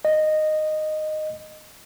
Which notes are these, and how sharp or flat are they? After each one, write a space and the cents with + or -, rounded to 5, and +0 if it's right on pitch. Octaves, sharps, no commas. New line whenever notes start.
D#5 -10